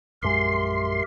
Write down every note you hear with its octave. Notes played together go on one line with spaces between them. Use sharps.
A#1 F#2 G#3 G4 A#4 E5 C6